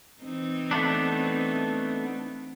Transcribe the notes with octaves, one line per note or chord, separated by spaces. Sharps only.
E3 C4 D#4
A3 B3 D4